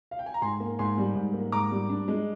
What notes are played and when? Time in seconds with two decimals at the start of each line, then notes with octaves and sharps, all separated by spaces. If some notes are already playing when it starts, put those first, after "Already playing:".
0.11 F5
0.19 G5
0.26 G#5
0.34 A#5
0.42 G#2 G#5 C6
0.60 A#3
0.79 G#2 G#5 C6
0.98 G3
1.15 G#2
1.33 A#3
1.52 G#2 A#5 D6
1.71 G3
1.89 D4
2.08 G#3